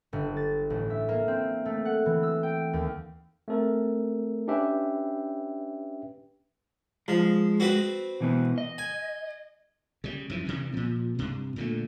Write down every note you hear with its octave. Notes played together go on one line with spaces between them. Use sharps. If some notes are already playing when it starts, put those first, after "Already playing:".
G1
A6
A1
E5
A#3
C4
A3
F#5
E3
E6
G5
D#2
A3 C4 A4 A#4
C#4 D4 G4 B4 E5 G5
F3 G#3
C4 F#4 B4
B2 E3 B3
D#5
G#5
C#3 G3
F#2 E3 F3
G2 C3 E3
A#2 F3
G2 C3
A#2 D3 A3